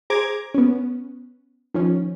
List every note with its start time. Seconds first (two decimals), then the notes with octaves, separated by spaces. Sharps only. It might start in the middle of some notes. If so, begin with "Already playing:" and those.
0.10 G#4 C5 A#5 D6 G#6
0.54 B3 C#4
1.74 D#3 F3 C#4